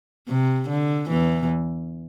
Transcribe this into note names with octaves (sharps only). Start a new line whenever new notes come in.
C3
D3
E2 E3